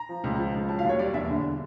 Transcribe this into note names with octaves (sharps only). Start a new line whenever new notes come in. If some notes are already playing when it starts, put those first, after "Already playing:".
Already playing: A#5
F3
C#2
F3
C#2
F#3 A5
F5
D#2
C#5
G3 D5
E2 E5
D3